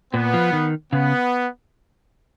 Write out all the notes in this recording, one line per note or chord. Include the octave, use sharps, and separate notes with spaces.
A#2 B3
F3
D#3
C#3 B3